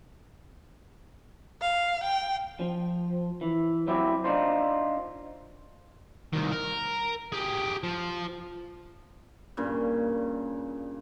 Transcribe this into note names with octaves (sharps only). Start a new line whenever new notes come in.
F5
G5
F3
E3
F#3 C4 E4 G4
D4 D#4 F4 C5
C2 D#3
A#4
G4 G#4
F3
G2 A#2 C#3